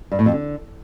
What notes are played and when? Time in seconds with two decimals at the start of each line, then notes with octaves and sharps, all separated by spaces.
0.12 G2
0.19 A2
0.26 F2
0.33 D3